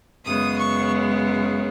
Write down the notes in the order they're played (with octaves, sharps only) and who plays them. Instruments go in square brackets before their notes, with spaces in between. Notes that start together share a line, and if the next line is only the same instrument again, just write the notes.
[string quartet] F#2 C#3 G#3 B3 D#6
C#6